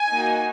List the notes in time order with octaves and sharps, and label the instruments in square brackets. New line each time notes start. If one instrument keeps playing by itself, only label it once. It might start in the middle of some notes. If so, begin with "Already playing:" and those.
Already playing: [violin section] G#5
A#3 D#4 F#4